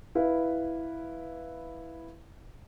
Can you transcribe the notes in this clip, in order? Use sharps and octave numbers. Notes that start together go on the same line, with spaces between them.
E4 B4 F5